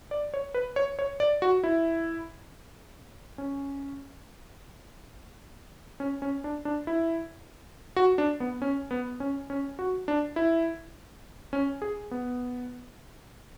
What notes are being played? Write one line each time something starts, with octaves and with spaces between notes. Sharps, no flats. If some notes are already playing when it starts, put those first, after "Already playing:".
D5
C#5
B4
C#5
C#5
D5
F#4
E4
C#4
C#4
C#4
D4
D4
E4
F#4
D4
B3
C#4
B3
C#4
C#4
F#4
D4
E4
C#4
G#4
B3